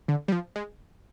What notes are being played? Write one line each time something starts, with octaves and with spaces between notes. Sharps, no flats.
D3
G3
F3
G#3